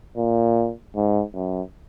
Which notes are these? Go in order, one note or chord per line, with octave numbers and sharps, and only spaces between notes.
A#2
G#2
F#2